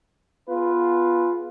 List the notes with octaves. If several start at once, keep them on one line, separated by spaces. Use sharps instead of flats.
B3 F4 G#4 B4